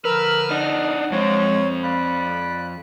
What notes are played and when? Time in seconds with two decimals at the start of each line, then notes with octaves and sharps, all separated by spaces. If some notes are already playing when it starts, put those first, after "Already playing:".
0.05 D3 F3 A#4 B4 E6 F6
0.51 D4 D#4 F#5
1.11 F2 G#3 C4 C#5
1.84 D5 F5 B5 F#6